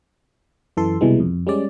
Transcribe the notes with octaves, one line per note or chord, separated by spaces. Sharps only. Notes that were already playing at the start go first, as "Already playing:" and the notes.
F#2 E3 A4 C6
C2 B2 E3 G3 G#3
F2
G3 G#3 C#4 D5